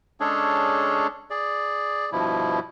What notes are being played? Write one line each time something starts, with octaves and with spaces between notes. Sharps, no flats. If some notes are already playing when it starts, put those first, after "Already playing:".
G#3 C#4 D4 G#4 A4 C#5
G#4 D5
G2 B2 F3 E4